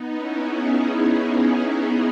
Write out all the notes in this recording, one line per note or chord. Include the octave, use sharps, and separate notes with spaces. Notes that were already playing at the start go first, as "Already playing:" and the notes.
Already playing: B3 D#4
C#4 E4
E4 G#4
E4 G#4